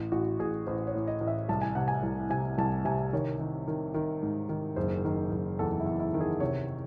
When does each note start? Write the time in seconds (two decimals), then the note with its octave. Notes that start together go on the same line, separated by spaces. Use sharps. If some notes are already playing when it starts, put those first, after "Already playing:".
Already playing: A1
0.12 A1 F#4
0.39 A1 G#4
0.67 A1 C5
0.87 C#5
0.94 A2
1.07 D#5
1.21 A1
1.27 E5
1.49 C2 A5
1.62 G#5
1.75 C3 F#5
1.88 G#5
2.03 C2
2.30 C3 G#5
2.58 C2 A5
2.85 C3 G#5
3.13 D#3 C#5
3.39 D#3
3.68 D#3
3.94 D#3
4.23 G#2
4.49 D#3
4.76 F#1 C5
5.05 D#3
5.32 F#1
5.59 E2 A4
5.80 E4
5.86 E2
6.00 E4
6.14 D#3
6.21 G#4
6.40 C3 C#5